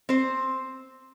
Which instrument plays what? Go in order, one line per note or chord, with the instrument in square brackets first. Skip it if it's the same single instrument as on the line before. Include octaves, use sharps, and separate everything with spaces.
[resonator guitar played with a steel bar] C4 C5